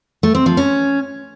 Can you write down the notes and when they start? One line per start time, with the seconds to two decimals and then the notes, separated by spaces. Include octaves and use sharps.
0.23 A3
0.35 C4
0.46 F3
0.57 C#4